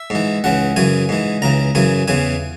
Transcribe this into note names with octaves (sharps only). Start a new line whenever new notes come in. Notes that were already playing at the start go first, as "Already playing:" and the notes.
Already playing: E5
G#2 E3
C#2 C#3 E3 F#5
F#2 C#3 E3 G#5
G#2 E3
C#2 C#3 E3 A#5
F#2 C#3 E3 G#5
E2 C#3 E3 G#5